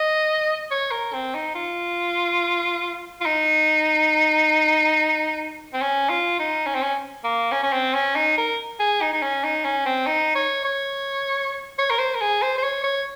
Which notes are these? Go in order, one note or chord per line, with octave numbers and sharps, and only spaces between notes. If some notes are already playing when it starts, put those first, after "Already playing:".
Already playing: D#5
C#5
A#4
C4
D#4
F4
F4
D#4
C4
C#4
F4
D#4
C#4
C4
C#4
A#3
C#4
C#4
C4
C#4
D#4
A#4
G#4
D#4
D#4
C#4
D#4
C#4
C4
D#4
C#5
C#5
C#5
A#4
C5
A#4
G#4
C5
C5
C#5
C#5